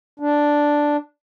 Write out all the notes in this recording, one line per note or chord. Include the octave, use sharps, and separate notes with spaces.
D4